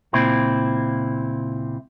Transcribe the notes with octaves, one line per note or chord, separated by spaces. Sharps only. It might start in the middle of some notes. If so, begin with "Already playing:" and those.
C#2 A#2 C4 E4